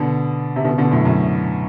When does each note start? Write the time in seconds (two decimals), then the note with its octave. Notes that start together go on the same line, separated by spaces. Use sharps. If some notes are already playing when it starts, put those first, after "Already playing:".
Already playing: B2 D3
0.56 C3
0.65 B2 D3
0.78 B2 D3
0.91 F#2 A2
1.05 F#2